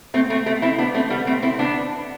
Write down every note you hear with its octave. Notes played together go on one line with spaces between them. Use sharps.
A3 C4
A3 C4
A3 C4
C4 E4
B3 D4
A3 C4
G3 B3
A3 C4
C4 E4
B3 D4